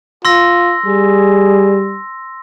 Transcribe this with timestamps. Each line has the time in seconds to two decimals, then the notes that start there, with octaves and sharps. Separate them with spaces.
0.25 F4 C6 E6 A#6
0.86 G3 G#4